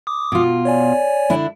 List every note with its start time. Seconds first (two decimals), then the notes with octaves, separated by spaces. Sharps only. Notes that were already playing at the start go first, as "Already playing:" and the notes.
0.07 D6 D#6
0.32 B2 F4
0.65 C#5 D5 G#5
1.30 D3 D4 E4